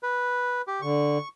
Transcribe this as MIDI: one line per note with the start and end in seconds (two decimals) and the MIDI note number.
0.03 0.62 71
0.67 0.81 67
0.82 1.18 50
0.82 1.28 85